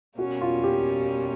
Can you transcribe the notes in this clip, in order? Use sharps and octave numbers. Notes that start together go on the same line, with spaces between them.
B2 G3 A#3 C#4 F#4
F4
G4